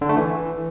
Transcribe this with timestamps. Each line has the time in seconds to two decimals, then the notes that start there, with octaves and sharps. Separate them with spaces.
0.01 D3
0.09 A3
0.17 E3